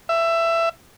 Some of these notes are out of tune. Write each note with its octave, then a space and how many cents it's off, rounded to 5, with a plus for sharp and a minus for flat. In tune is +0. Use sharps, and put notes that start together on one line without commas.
E5 +20